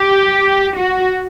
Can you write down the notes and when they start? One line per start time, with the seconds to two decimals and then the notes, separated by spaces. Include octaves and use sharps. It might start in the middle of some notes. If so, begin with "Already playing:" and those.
Already playing: G4
0.76 F#4